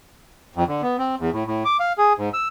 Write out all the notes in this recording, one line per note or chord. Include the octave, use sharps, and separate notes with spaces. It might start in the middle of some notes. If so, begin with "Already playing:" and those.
F2
D3
B3
C4
E2
A2
A2
D6
F5
G#4
G#2
E6